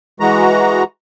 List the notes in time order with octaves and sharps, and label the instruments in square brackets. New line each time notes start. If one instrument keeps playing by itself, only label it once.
[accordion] E3 G#3 F#4 A#5